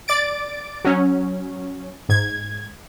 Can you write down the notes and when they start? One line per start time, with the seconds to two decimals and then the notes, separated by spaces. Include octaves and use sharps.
0.08 D5 A6 D7
0.85 F#3 C#4
2.09 G#2 G#6